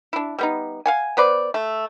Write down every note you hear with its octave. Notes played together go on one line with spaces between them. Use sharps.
D4 E4
G3 B3 D#4
F5 F#5 G#5
B3 B4 C5 D5
A3